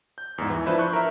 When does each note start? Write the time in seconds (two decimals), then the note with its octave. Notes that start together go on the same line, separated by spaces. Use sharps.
0.18 G6
0.38 E2 G#2
0.50 E3
0.66 F3 D4 E4 B4 C5 E5
0.79 C#6 F#6 G6
0.93 A#4 E5